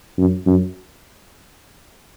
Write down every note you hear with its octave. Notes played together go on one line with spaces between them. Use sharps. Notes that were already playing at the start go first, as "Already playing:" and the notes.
F#2
F#2